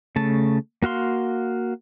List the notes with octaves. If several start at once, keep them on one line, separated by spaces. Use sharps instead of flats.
C#3 A3 A5
A#3 F#4 F5 C6